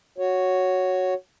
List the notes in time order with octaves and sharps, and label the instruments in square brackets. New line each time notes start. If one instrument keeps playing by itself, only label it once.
[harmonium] F#4 C#5